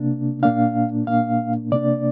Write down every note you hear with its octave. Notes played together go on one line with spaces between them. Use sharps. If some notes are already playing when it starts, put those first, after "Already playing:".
Already playing: C3 A#3 D4
A#2 A#3 D4 F5
A#2 A#3 D4 F5
C3 A#3 D4 D5